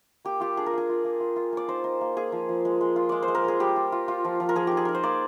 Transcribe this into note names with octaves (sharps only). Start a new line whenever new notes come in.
A#3 G4
F4 G4
D4 G#4
A#4
A#3 G#4
F4
A#3
F4
F4
A#3 D5
D#4 C5
D#4
A#3
A#3 G#4
F3
F3
G#3
G#3
F4
G#3 D5
C5
G#3
A#4
G#3 G#4
G3 G4
F4
F4
F4
F3
F3
A#4
F3 G#4
D#4 G4
G#4
D#4 A#4
C5
A#3 D5